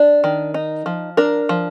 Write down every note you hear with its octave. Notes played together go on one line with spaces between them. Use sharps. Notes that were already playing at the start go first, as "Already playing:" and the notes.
Already playing: D4 D5
D#3
D#4
F3
D4 A#4
F3